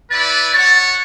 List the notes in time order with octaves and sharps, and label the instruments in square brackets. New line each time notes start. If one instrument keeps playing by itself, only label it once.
[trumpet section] B3 E4 B4 D5 [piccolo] A6
[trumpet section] F#4 C#5 F#5 [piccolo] A6